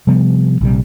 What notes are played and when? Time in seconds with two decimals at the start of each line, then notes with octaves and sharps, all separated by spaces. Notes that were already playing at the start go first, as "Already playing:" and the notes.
0.07 C3 F3 G3 B3
0.61 A#1 C3 G3